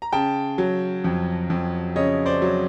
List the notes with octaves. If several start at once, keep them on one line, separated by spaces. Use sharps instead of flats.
A#5
C#3 G5 A5
F#3
F2
F2
C#3 C#5 D#5
C5 D5
F#3